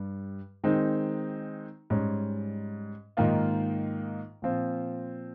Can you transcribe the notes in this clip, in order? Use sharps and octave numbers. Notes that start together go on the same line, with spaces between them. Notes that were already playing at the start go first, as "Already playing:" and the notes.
Already playing: G2 G3
D#3 G#3 C4 D#4
G#2 G3 C#4
G#2 D#3 A#3 F4
A#2 F3 C4 F4